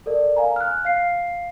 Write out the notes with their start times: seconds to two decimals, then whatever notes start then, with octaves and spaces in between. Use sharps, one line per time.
0.06 A4 A#4 D5
0.36 F5 G#5 A#5
0.56 F6 F#6
0.85 F5 C7